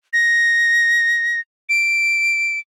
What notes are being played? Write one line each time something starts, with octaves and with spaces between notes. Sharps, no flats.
A#6
D7